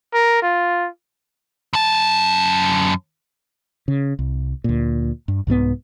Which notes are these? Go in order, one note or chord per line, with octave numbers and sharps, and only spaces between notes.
A#4
F4
F#2 A5
C#3
C2
D2 A#2
G2
C2 G#2 E3 B3